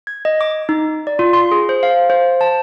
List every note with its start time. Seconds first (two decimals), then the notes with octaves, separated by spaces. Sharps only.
0.07 G#6
0.25 D#5
0.41 D6
0.69 D#4
1.07 D5
1.19 F4
1.33 C6
1.51 G#4
1.69 C5
1.83 F5
2.10 C5
2.41 A5